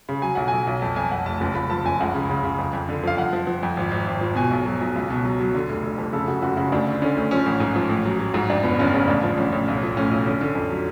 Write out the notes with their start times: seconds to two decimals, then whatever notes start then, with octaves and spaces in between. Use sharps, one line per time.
0.09 C#3
0.22 F#3 G#5
0.35 B1 F#5
0.48 B1 G#5
0.67 B1
0.81 F2 A5
0.96 F2 G#5
1.11 F2 F#5
1.26 F1 A5
1.40 F#1 A5
1.55 F#1 B5
1.70 F3 A5
1.85 F#1 G#5
2.00 C#2 F#5
2.14 C#3
2.29 C#3
2.44 C#3
2.59 F2
2.73 F2
2.89 D3
3.04 F3 F5
3.17 F2 F#5
3.33 F3
3.47 F3
3.63 F2
3.77 G#1
3.91 G#1
4.07 G#1
4.21 F3
4.35 B2 G#5
4.51 B1
4.66 F#3
4.81 B1
4.96 C#2
5.10 B2
5.25 F#3
5.40 F#3
5.55 D3
5.69 F1
5.83 F1
5.98 F2
6.13 C#3 A4
6.28 C#3 F#4
6.42 F#1 F#4
6.57 C#3 F#4
6.72 D2 D4
6.87 D3
7.02 D3 C#4
7.17 D2
7.31 F3 C#4
7.46 A1
7.60 G#2
7.76 F3
7.90 A1
8.06 F#3
8.19 F#3
8.34 G#2
8.50 F2 D4
8.63 F#1 B3
8.79 F#1 C#4
8.93 C#3 C#4
9.08 A1 D4
9.23 F3
9.38 A1 C#4
9.53 A1
9.68 B1
9.83 F3
9.97 A2 C#4
10.11 B1
10.26 D3 C#4
10.41 D3
10.55 F2
10.71 F#3